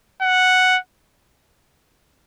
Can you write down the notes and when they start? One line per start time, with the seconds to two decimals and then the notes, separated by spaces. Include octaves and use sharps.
0.22 F#5